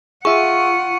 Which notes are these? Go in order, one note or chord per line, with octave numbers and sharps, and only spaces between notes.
F4 G#4 E5 F#5 C#6